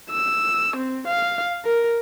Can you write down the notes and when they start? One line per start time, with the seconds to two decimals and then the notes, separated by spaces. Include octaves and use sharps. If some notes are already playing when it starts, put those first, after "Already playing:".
0.11 E6
0.77 C4
1.08 F5
1.65 A#4